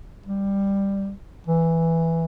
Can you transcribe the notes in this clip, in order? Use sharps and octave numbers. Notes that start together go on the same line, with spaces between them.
G3
E3